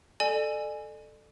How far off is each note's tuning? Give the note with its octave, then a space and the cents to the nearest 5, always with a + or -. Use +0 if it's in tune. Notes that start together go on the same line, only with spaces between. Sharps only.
A4 +0 D5 +40 G#5 +0